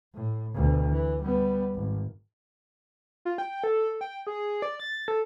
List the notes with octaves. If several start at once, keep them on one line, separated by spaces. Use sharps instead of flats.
A2
D2 B2
E3
G3 B3
G#1
F4
G5
A4
G5
G#4
D5
A6
A4